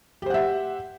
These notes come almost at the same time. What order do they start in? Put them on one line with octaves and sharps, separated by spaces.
G4 C5 F#5 E5